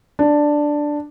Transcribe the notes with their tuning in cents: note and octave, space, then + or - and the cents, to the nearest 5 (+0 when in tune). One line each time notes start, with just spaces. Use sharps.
D4 +5